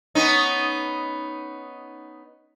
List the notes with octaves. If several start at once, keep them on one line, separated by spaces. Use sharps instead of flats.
B3 C#4 D#4